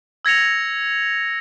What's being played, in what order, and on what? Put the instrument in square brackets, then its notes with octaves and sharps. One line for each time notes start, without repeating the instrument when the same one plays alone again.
[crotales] E6 G#6 A#6 C#7 F7